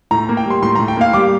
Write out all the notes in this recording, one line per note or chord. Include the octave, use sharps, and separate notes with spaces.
A2 A#5
A#3
G5
G3 C6
A2 C6
A2 A#5
G5
A#3 F5
G3 D6